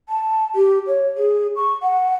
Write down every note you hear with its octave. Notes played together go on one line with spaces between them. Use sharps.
A5
G4
C#5
G#4
C#6
F#5